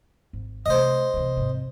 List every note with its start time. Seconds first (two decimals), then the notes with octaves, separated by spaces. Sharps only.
0.33 G#1
0.66 C3 A3 C5 D#5
1.14 C3 E3
1.37 G#1 C3